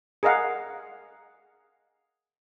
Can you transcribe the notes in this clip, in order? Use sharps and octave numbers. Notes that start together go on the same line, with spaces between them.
G#4 A#4 D#5 F5 F#5